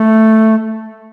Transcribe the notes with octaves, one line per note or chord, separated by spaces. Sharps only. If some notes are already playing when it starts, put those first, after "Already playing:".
Already playing: A3